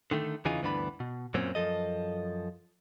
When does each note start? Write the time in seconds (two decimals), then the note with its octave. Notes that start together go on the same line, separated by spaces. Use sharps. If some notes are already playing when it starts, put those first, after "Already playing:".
0.11 D3 D#3 A3
0.45 E2 C#3 E3 D#4 F4 G#4
0.62 D2 G2 E3 B3 D4 B5
1.00 B2
1.34 F#2 A#2 F#3 A#3 C4 C#4
1.55 F#2 A#2 F3 A4 D#5